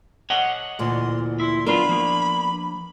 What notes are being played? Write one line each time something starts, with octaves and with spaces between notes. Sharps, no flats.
C#5 D#5 F#5
D2 A#2 E3 C6
E4 C6
F#3 B3 D4 F4 A#4 B5
F3 A#3